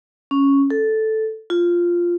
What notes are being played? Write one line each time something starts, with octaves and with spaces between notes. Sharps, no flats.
C#4
A4
F4